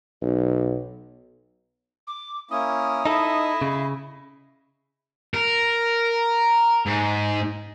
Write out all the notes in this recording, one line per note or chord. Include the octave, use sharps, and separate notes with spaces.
B1
D6
A#3 C#4 E4 D#6
D#4 E4 A4 D#5
C#3 F5
A#4
G#2